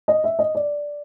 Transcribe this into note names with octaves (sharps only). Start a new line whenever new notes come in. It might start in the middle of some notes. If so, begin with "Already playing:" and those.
D#5
E5
D#5
D5